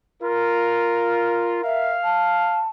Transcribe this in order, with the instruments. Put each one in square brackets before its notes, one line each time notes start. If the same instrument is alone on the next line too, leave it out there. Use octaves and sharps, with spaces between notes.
[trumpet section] F4 [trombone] A#4
[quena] E5 [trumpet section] F5
[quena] A5